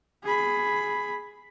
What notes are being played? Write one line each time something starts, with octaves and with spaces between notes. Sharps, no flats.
G#4 B5